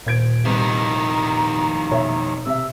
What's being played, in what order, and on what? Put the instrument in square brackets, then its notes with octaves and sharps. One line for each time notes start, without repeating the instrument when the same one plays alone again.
[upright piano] D#1 G#6 D7 [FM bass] A#2 [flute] C5
[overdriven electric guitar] F2 D#3 [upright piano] C3 G3 [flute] B4
[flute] A#5
[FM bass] B2 [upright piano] C#5 E5
[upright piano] C3 E5 [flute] E6